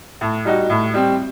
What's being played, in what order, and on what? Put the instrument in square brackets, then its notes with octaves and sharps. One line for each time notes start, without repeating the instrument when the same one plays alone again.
[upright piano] A2
G3 D#4 F#4
A2
G3 C4